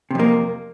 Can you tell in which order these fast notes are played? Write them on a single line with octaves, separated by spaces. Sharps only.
C3 F2 A#3